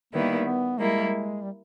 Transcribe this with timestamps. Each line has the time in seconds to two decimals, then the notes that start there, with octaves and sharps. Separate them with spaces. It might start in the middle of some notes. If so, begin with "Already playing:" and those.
0.13 D#3 G3 A#3 B3 E4
0.39 A#3
0.45 B3
0.78 G3 G#3 A#3 E4
1.43 G3